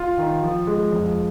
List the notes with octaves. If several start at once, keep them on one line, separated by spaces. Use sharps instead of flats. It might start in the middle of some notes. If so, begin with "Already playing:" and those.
Already playing: F4
D#3
F3
G#3
F2